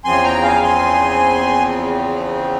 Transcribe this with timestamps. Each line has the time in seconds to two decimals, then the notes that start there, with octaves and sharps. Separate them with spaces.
0.04 E2 C#3 F3 C4 G#5 C6
0.24 G5 A#5
0.43 F5 G#5
0.62 G#5 C6